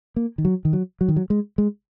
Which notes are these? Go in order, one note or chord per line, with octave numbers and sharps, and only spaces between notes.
A#3
D#3
F#3
D#3
F#3
F#3
D#3
F#3
G#3
G#3